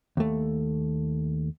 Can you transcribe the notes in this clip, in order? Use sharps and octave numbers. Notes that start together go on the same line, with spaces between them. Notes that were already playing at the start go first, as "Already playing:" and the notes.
D#2 A3